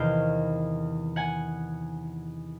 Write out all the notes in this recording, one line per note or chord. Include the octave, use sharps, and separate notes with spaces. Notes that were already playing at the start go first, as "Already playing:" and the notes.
Already playing: E2 C3 D#3 F5 G5
F#5 G#5